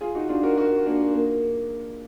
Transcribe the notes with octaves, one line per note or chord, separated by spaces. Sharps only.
F4 G#4
D#4 F#4
D4 F4
F#4 A#4
F#4 A#4
A#3 D4
A#3